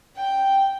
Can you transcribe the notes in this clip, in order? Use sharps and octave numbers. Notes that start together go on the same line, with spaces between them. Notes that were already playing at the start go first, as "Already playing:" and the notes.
G5